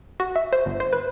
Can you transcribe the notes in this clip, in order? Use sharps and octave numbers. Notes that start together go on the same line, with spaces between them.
F#4
E5
C5
G1
C5
B4